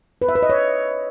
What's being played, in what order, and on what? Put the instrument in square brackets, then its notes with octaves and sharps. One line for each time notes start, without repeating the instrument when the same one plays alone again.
[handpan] B4
E5
B4
D#5
C#5